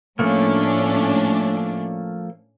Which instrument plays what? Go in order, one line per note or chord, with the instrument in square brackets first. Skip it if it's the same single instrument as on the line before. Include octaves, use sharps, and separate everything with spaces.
[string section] A2 C#4 D4 [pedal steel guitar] F3 A3 A#3